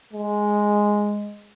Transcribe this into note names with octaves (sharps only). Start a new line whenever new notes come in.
G#3